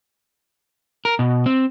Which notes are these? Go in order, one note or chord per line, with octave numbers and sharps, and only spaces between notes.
A#4
B2
C4